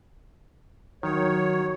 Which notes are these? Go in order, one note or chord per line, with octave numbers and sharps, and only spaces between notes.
D#3 F#3 C#5